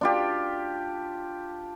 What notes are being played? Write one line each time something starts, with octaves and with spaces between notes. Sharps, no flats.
D4 F4 G4